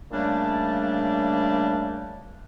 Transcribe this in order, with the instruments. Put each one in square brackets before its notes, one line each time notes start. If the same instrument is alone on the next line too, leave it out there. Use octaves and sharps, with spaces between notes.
[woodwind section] A#2 C#3 G3 A3 A#3 D4